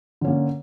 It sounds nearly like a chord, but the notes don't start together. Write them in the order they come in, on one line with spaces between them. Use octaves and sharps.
D3 C#4 A#3